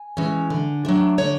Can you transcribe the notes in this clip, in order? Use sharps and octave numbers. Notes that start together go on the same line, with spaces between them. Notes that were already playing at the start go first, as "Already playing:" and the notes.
Already playing: G#5
E3 G#3 C#4
D3
F#3 A3 D4
D3 C#5